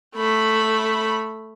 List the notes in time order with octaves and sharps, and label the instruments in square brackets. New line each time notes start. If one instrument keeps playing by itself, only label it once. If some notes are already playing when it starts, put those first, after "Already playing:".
[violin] A3 B5